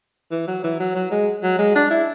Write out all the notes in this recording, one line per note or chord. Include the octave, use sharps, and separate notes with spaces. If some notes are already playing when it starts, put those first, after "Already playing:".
E3
F#3
E3
F#3
F#3
G#3
F#3
G#3
D4
E4